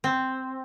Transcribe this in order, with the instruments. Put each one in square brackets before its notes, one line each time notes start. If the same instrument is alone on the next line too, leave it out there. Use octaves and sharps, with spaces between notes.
[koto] C4